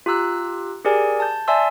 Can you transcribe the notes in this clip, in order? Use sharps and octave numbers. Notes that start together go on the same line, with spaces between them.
F4 G4 A#5 E6 F#6
G4 G#4 A#4 D5 G#5
A5 G6
D5 E5 G#5 A5 C6 E6